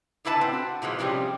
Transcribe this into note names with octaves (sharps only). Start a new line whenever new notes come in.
A2 D3 E4 B4 G#5 A5
C4
F#4
A#2 E3 F3 G#3
C3 F3 G3 C4 C#4